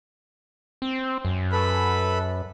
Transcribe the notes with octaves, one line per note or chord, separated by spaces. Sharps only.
C4
F#2
A4 B4 B5